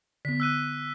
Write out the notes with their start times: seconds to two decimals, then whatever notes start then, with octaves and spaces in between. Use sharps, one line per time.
0.25 D3 B3 B6
0.40 E6 F#6 D#7